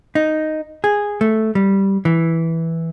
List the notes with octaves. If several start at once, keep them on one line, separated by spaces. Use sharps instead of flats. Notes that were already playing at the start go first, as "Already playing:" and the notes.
D#4
G#4
A3
G3
E3